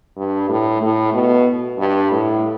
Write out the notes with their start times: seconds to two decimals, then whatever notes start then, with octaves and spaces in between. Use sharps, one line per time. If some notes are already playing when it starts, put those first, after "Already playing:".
0.17 G2
0.49 A2
0.82 A2
1.14 B2
1.79 G2
2.11 A2